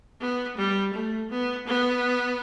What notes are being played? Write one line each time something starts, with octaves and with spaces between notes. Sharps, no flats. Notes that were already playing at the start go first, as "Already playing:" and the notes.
B3
G3
A3
B3
B3